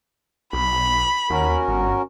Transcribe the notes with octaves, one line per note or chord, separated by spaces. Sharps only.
B1 B5
D#2 C#4 F#4 A#4
G1